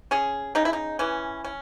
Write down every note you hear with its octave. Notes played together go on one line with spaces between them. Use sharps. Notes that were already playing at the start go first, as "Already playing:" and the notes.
C#4 G#4
C#3 D#4
E4
D#4
E3 C#4
C#4